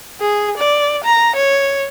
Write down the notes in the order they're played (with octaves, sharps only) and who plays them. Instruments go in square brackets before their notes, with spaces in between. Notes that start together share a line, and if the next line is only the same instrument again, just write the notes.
[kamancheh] G#4
D5
A#5
C#5